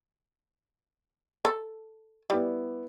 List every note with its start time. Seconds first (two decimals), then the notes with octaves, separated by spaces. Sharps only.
1.45 A4
2.30 G3 B3 E4 D5